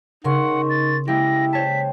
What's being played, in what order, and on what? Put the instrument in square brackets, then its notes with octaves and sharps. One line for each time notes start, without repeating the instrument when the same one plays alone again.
[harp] C#3 [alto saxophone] D#4 [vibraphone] A#4 C6 C#6 [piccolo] F#5
[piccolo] A6
[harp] G#3 A#3 G4 [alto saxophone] E4 [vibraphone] G5 [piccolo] A#6
[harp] C5 C#5 A5 [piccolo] B6